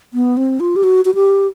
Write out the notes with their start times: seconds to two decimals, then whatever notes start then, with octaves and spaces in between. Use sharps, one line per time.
0.14 B3
0.37 C4
0.60 F4
0.76 G4
0.83 F#4
1.05 F#4
1.15 G4